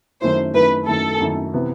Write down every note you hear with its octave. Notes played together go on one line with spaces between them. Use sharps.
F#2 D#3 A3 E4 C5
F#2 D#3 A3 E4 B4
F#2 D#3 A3 E4 A4
F#2 D#3 A3 E4
C3 E3 B3 E4